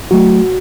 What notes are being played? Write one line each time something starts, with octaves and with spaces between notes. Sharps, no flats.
F#3 A3 F#4